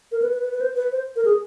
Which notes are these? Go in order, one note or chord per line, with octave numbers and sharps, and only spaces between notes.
A#4
B4
B4
B4
B4
C5
B4
C5
A#4
G#4